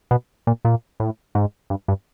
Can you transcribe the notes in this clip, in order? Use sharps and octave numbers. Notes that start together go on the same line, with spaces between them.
B2
A#2
A#2
A2
G#2
G2
G2